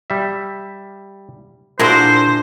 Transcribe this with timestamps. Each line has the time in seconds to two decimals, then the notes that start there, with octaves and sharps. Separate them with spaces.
0.10 G3 E5
1.79 A#2 D4 E4 F#4 G#4 A#4 C5